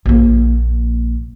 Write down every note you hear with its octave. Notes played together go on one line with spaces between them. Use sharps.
A#1 A#3